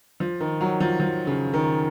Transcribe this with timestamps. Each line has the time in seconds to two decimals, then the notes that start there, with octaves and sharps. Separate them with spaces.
0.20 F3
0.40 D#3
0.61 F#3
0.80 F3
1.00 F3
1.27 C#3
1.54 D#3